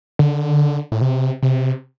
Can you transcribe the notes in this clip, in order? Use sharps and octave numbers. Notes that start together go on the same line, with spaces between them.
D3
A2
C3
C3